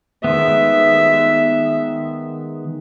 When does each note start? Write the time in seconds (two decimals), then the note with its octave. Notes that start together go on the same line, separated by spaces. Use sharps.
0.24 D#3 G#3 B3 E5